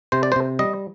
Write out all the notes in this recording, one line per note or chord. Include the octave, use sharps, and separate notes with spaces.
C3 C5
D5
C5
C3
G3 D#5